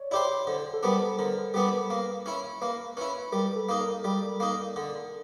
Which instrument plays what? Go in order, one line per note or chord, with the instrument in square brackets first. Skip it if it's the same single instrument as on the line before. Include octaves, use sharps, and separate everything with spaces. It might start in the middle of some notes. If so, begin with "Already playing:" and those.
Already playing: [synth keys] C#5 D5
[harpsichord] E4 G4 C5 [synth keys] D5
[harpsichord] D3 [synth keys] C5
[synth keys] A4
[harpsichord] G3 B3 D4 [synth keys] A#4
[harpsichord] D3 [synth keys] A#4
[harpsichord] G3 B3 D4
A#3
C#4 E4
[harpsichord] A#3 [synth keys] B4
[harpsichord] C#4 E4 [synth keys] B4
[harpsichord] G3 [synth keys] A#4
[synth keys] A4
[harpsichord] A#3 D#4
[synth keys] A#4
[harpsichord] G3 [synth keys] D5
[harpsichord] A#3 D#4
D3